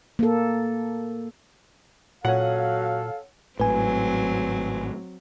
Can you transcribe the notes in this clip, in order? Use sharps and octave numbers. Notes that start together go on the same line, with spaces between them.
A#3 A4
A#2 F#3 C#4 A4 F5 F#5
G#1 A2 F#3 C4 B4 G#5